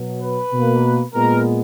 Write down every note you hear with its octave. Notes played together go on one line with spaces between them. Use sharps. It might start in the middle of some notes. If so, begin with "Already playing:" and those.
Already playing: B2 F#3 B3
B4
B2 A#3
A#2 G#3 B3 A#4